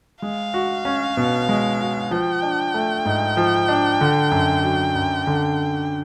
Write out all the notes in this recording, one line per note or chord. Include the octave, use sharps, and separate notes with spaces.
G#3 F5
F#4
C#4
B2
G#3
F#4
F3 G5
D4
A3
G#2
F3
D4
D3
F#2
F#3
F#2
D3